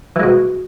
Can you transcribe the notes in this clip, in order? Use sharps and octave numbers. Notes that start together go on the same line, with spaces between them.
B2 E3 G#3